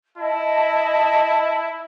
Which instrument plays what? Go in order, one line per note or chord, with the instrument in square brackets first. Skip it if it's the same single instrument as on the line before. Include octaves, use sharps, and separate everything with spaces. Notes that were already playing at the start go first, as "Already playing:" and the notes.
[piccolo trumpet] E4 [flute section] D#5 A5